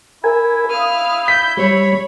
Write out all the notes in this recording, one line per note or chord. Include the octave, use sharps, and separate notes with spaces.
E4 A#4 G#5
F5 D#6 F6
G6 B6
G3 C#5 B5